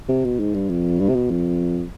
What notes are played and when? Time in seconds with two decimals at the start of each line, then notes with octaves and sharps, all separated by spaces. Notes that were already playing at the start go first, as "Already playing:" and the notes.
0.08 C3
0.24 B2
0.39 G#2
0.54 G2
0.69 F2
0.99 G2
1.08 C3
1.15 B2
1.30 F2